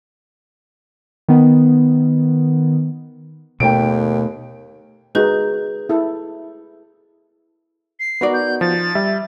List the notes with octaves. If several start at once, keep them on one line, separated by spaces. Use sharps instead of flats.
D#3 B3
D#2 B2 A3 G5 D7
G#3 D#4 F#4 G#4 B4 G6
E4 A4
C7
B3 D#4 F#4 A#4 D5
G6
F3 A6
G3 E5